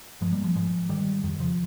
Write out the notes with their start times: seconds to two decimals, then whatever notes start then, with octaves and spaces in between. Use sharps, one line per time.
0.21 G2 F3 G#3
0.33 G3 A#3
0.44 F3 G#3
0.55 G#2 F3 G#3
0.89 G#2 D#3 G3
1.24 F2 D#3
1.40 C#3 F3